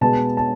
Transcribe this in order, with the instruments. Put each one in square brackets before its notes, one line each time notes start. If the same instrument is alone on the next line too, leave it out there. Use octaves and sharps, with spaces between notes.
[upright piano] B2 G#3 B3 A5
A5